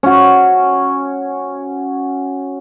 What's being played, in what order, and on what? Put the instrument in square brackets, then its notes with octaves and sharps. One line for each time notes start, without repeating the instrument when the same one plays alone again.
[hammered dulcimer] C#4 F#4